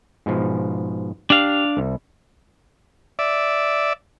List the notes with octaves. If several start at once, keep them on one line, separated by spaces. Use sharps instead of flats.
G#2 B2 F3
D4 G4 F5
C2
D5 E5